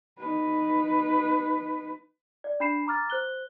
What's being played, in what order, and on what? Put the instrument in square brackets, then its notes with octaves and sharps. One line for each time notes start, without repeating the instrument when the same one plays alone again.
[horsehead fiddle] D#4 B4
[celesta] D5
D4 B5 C7 E7
A#5 D6 F6 A6
C5 F#6 G7